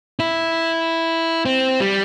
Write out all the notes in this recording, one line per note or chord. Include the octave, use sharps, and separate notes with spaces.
E4
C4
G3